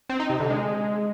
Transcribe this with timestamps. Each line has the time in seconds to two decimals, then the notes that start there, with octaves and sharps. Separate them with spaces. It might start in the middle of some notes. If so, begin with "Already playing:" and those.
0.09 C4
0.20 D#4
0.30 C3
0.40 D3
0.50 G#3